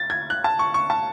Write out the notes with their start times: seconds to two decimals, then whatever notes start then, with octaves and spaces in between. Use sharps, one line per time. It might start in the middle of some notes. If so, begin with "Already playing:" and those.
Already playing: A6
0.10 G#6
0.30 F#6
0.44 A5
0.59 C#6
0.74 C#6
0.90 A5